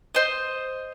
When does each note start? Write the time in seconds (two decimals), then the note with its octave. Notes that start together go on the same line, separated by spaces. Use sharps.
0.15 C5 D#5